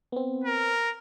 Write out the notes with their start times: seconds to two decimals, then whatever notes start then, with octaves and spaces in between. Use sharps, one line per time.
0.12 B3 C4
0.44 A#4